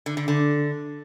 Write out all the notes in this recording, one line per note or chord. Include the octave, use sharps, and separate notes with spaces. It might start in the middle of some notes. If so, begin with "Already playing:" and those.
D3
D3
D3